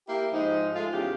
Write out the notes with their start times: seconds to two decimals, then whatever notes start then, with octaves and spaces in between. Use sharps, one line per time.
0.08 A#3 E4 G4
0.33 G#2 F3 D#4
0.75 G#3 A3 F4
0.93 E2 C#3 G4 F5